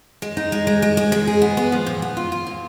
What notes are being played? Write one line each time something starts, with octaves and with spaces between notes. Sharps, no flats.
G#3
D#4
G#3
G#3
G#3
G#3
G#3
G#4
B3
B3
F3
A#2
B3
F4
F4
A#2